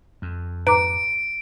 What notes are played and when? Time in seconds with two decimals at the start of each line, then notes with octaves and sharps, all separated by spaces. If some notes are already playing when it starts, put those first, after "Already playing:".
0.22 F2
0.67 G#2 B4 A#5 D6 D7